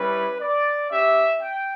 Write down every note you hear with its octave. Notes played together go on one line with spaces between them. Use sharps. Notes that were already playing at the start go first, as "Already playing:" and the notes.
Already playing: G3 C#4 E4 B4
D5
C#4 G4 E5
G5